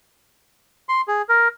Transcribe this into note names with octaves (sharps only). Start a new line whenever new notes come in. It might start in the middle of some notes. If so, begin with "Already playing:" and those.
C6
G#4
A#4